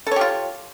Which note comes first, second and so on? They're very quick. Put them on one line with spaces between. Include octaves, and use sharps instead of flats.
A4 C#5 G4 F4